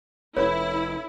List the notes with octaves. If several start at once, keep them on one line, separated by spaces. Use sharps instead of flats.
F1 C#4 E4 A4 B4 C#5 B5